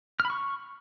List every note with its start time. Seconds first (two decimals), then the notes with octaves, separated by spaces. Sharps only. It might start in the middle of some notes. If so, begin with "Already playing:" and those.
0.20 F6
0.25 B5
0.30 C#6